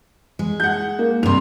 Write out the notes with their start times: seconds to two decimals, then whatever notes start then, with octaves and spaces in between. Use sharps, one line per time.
0.39 G#3
0.60 F#5 G6
0.99 A#3
1.23 G2 C3 C6 F7